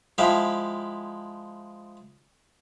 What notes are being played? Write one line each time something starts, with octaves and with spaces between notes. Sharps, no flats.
F3 G#3 E4 G4 E5 F5